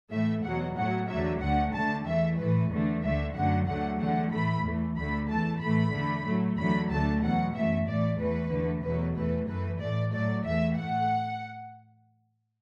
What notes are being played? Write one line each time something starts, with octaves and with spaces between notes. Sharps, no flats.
A2 E3 A3 E5
E2 B2 F#3 F#5
A2 F#3 A3 F#5
E2 D3 F#3 A3 E5
D2 D3 A3 F#5
D2 D3 A3 A5
E2 E3 A3 E5
A2 E3 A3 B4
E2 D3 A3
D2 D3 A3 E5
F#2 D3 F#3 A3 F#5
D2 D3 F#3 A3 F#5
E2 D3 A3 F#5
A2 E3 A3 B5
E2 E3 A3
D2 D3 A3 B5
E2 E3 A3 A5
A2 E3 A3 B5
E2 D3 A3
A2 F#3 A3
E2 D3 F#3 A3 B5
D2 D3 A3 A5
E2 B2 F#3 F#5
F#2 E3 A3 E5
A2 E3 A3 D5
E2 E3 A3 B4
E2 D3 A3
E2 B2 F#3 A3 B4
E2 E3 A3 B4
F#2 E3 A3 B4
A2 E3 A3 D5
A2 F#3 A3 D5
E2 E3 A3 E5
A2 A3 F#5